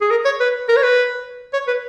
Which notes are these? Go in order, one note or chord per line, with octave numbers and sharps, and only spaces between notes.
G#4
A#4
C#5
B4
A#4
C#5
B4
C#5
B4